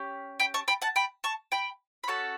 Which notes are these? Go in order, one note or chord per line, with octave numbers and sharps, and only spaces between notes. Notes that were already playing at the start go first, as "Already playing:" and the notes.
Already playing: C#4 G4
G5 B5
A5 C#6
G5 B5
F#5 A5
G5 B5
A5 C#6
G5 B5
B5
C#4 F#4 A4 F#5 A5